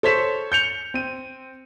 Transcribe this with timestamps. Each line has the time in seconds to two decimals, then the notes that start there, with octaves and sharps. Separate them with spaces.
0.03 A4 C5 C#5 B6 E7
0.52 G6 C#7 F7
0.94 C4 D#7